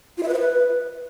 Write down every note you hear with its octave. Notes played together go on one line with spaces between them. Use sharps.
F4
E5
B4
C5
B4